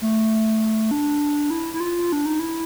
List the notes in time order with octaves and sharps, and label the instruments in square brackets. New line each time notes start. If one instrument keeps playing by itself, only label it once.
[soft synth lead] A3
D4
E4
E4
F4
D4
D#4
E4